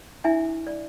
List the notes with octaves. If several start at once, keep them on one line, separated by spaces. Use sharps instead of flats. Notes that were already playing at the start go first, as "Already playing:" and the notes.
D4 E4 E5 G#5
D5